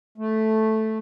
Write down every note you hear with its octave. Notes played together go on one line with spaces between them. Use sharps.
A3